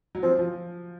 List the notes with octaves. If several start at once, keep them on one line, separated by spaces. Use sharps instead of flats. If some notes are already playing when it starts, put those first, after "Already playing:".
F#3
F3 C4
F3